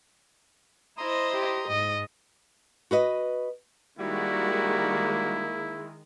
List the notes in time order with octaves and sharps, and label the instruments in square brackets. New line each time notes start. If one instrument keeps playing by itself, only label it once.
[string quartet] E4 C5 D#5 [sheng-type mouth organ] A#5 C6 D#6
[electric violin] G4
[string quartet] G#2 [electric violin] D#5
[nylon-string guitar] F#4 B4 D#5
[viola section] D#3 G#3 [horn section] G3 F#4 [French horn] A#3 [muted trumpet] E4